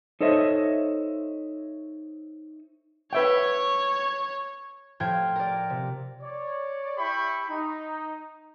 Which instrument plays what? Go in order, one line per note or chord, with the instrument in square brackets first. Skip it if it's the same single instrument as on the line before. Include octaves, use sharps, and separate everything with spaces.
[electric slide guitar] D#4 A4 C5 C#5 D#5 E5
[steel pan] B4 E5 G5 [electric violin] C#5
[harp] A2 F3 F4 G5 G#6
A#4 D5
C3
[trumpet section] C#5 D5
E4 G4 E5 G5 B5 C#6
D#4